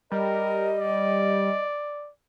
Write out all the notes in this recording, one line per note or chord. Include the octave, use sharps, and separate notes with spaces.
G3 A#4 D#5
D5